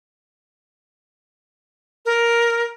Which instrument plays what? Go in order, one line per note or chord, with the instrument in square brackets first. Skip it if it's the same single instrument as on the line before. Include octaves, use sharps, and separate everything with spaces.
[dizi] A#4